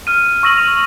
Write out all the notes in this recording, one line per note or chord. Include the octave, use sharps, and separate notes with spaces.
F6 D#7
C#6 E6 A#6 D#7 F#7
F7